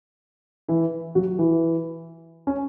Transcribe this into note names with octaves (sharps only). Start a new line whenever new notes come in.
E3 E4
F#3 F#4
E3 E4
C#4